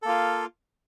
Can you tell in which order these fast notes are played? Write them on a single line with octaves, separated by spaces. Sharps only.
A4 A#3 F4